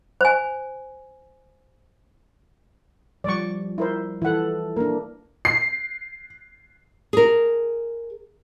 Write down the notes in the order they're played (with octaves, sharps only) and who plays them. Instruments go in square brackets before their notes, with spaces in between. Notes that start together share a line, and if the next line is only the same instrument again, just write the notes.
[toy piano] C5 G#5
[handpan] F3 G3 [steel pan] D5 C#6
[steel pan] E4 A#4 C5
[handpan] E3 A4 [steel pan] E4 F#5
[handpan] A#3 D4 [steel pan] A#4
[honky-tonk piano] C7
[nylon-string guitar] G#4 A#4